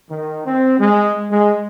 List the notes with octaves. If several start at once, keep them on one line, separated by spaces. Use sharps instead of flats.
D#3
C4
G#3
G#3